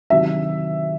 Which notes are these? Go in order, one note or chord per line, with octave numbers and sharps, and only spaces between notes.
C3 D#3 F#3 E5